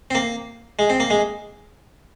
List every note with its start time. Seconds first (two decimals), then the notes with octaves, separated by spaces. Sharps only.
0.11 C4
0.15 A#3
0.79 G#3
0.90 C4
1.00 A#3
1.10 G#3